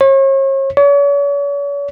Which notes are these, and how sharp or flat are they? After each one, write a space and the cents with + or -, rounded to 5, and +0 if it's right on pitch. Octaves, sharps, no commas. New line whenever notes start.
C#5 -40
C#5 +40